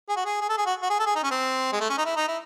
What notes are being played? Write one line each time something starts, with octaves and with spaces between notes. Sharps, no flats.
G#4
F#4
G#4
G#4
A4
G#4
F#4
F#4
G#4
A4
G#4
D#4
C#4
C4
G#3
A3
C#4
D#4
E4
D#4
E4